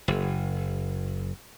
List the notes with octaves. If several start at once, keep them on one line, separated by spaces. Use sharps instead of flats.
F#1